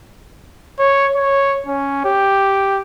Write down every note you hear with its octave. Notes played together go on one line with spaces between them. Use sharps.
C#5
C#5
C#4
G4